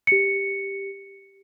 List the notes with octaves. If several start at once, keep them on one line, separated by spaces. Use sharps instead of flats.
G4 C#7